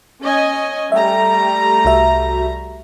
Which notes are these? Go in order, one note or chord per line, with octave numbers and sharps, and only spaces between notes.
C#4 D#5 G#5
G3 A3 E5 G5 A#5
C2 F#4 E5